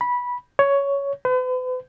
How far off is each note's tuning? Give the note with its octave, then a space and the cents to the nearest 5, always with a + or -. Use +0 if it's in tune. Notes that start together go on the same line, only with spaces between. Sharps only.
B5 -15
C#5 +10
B4 +45